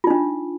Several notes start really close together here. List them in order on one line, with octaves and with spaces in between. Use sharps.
F4 D#4 D4